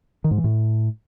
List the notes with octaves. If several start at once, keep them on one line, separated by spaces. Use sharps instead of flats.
D#3
G#2
E3
A2